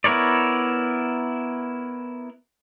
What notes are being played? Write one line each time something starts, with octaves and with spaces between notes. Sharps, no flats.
B3 E4 A#4 C#5 D5